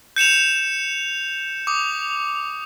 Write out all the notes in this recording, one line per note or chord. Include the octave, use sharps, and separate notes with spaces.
G6 C#7 E7 F7
D6 D#6